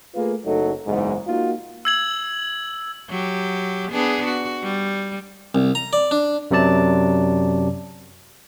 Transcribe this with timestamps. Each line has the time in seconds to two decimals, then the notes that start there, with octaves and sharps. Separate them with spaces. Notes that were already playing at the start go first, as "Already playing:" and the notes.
0.15 A3 A#3 F4 G#4 B4
0.45 F#1 F#3 A3 D#4 A4
0.87 F#1 E2 G#2
1.27 A#3 D#4 F4 F#4
1.85 E6 G#6 F#7
3.10 F#3 G4
3.92 B3 D4 G#4
4.26 F#4
4.63 G3
5.55 C2
5.75 A#5
5.93 D5
6.11 D4
6.51 F#2 C3 F#3 D5 A5